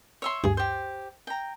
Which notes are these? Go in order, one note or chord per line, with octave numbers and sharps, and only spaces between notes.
C#5 E5 C6
D2 G2 G#4
G4 C5
G5 A#5